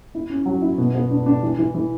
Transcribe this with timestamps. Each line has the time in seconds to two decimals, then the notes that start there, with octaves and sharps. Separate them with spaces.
0.15 E4
0.30 C#4
0.46 F#3
0.62 E4
0.78 B2
0.95 B3
1.11 D4
1.26 D4
1.43 E3
1.58 E3
1.74 E3